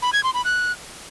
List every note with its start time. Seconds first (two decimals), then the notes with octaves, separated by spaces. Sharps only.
0.02 B5
0.13 G#6
0.24 C6
0.34 B5
0.45 F#6